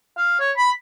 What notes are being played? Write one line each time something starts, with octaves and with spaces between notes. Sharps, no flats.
F5
C#5
B5